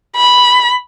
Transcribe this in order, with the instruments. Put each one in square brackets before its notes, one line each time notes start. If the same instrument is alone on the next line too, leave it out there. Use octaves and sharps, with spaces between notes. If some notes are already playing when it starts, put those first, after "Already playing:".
[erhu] B5